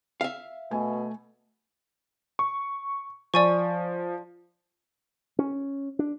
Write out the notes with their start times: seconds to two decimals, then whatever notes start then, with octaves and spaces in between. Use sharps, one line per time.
0.21 E5 F5
0.71 B2 A3 G#5
2.39 C#6
3.34 F3 D5 G#5 C#6
5.39 C#4
5.99 D4